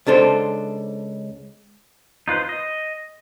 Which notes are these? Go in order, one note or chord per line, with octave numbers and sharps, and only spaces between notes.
C#2 D4 A4 C5
D#4 F4 B4 C5
D#5